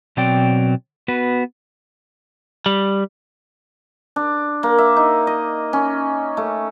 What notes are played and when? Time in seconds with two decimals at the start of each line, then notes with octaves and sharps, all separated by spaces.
0.17 B2 F#3 C4 D5 G5
1.08 B3 F#4 B4
2.66 G3
4.16 D4
4.63 A#3
4.78 E5
4.96 D#4
5.27 D#5
5.73 C#4
6.37 A3